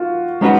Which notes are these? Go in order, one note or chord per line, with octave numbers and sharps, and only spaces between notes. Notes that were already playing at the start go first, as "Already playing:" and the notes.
Already playing: F4 F#4
G#3 C#4 D#4 F#4 B4